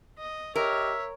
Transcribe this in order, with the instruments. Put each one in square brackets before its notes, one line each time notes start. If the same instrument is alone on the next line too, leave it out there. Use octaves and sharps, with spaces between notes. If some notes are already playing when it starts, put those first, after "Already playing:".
[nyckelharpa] D#5
[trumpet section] G4 D#5 [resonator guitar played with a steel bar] A#4 [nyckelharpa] C#5 [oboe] E5